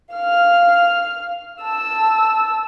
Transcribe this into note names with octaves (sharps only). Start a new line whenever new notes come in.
F5 F6
A5 E6